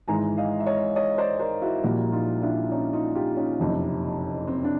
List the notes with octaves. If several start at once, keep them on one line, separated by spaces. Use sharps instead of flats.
G#1 G#2 E3 G#3 G#5 A#5
D#5 F5
E5
C#5 D#5
C#5 D#5
C5 D5
A#4 C5
E4 F#4
A#1 A#2 G3 A#3 E4 F#4
D#4 F4
D4 E4
C#4 D#4
D#4 F4
F4 G4
C#4 D#4
F#1 F2 C3
C4
D4